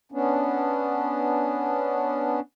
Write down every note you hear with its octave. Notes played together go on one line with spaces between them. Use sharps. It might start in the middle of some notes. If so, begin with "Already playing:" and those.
B3 C#4 D4